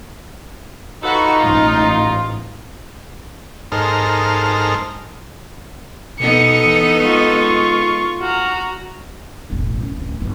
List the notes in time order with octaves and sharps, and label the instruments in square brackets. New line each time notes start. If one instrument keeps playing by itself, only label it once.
[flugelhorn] D#4 [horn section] F4 A4 B4 [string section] F#4 C#6
[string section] A1 G#2 [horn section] F4
[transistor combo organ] G#2 D#4 A4 A#4 C5 F6
[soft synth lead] B2 [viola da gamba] B3 D#4 A4 [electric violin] C#7
[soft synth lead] E3
[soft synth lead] G#3 [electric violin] F4 C#6
[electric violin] F#4 A#5 [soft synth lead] F6
[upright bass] E1 A1
F#2
D1 C#4
G1 E3